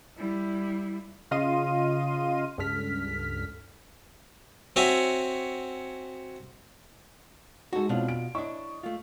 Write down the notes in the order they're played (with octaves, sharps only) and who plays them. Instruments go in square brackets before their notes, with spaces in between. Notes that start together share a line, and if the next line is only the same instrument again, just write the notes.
[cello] G3 E4
[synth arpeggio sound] C#3 F4 D#5 F5 C6 D#7
C#2 G2 A4 F6 B6
[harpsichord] C4 F#4 C#5 E5 G#5
[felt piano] G#3 D#4 [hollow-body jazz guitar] F#4 A4
[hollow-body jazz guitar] B2 D4 F4 [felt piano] C4 E4 C#5
[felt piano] D7
[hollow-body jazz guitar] D4 E4 [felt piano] C#5 D#5 C#6
[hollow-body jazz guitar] A3 F4